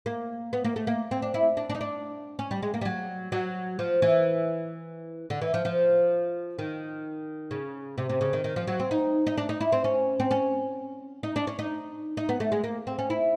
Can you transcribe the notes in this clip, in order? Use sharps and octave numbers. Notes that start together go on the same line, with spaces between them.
A#3
B3
A#3
A3
A#3
C4
D4
E4
D4
D4
D#4
D4
C#4
G3
G#3
A#3
G3
F#3
F#3
F3
E3
D3
E3
F3
F3
D#3
C#3
C3
C3
C#3
D#3
D#3
F3
F#3
C4
D#4
D#4
D4
D#4
E4
C4
C#4
C4
C#4
D#4
D4
C#4
D#4
D#4
B3
A3
G#3
A#3
C4
C#4
E4